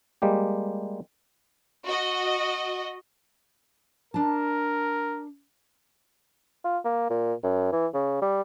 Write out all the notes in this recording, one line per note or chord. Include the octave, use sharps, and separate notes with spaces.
G3 G#3 A#3 G4
F#4 D#5
D4 A#4 A5
F4
A#3
A#2
F#2
E3
C#3
G3